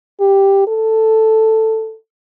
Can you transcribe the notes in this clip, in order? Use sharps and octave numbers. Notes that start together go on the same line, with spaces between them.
G4
A4